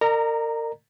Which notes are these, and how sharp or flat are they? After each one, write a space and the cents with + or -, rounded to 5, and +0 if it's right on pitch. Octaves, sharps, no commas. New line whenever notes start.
A#4 -30 D5 +45 A#5 -5